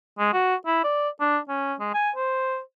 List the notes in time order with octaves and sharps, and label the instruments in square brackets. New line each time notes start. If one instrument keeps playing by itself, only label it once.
[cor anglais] G#3
F#4
E4
D5
D4
C#4
G#3
G#5
C5